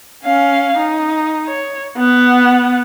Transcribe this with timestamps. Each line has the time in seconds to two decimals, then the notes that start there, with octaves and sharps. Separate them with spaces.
0.24 C#4 F5
0.78 D#4
1.48 C#5
1.97 B3 F#5